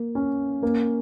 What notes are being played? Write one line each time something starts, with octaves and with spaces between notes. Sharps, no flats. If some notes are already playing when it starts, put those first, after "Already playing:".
Already playing: A#3
C#4
A#3